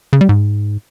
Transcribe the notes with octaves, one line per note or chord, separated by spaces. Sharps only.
C#3
G3
G#2